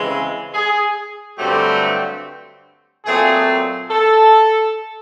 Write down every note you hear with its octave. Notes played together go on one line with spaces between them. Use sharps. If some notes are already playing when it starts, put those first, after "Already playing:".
Already playing: C#3 E3 G#3 C4
G#4
G2 D3 F#3 A3 C4 G4
A#2 F#3 A3 C4 G#4
A4